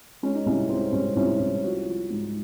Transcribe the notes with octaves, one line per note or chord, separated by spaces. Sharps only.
G#3 C#4
D#4
C2 C#4
G#3 C4
C2 C#4
C2 C#4
C2
F3 F#4
F3
G#2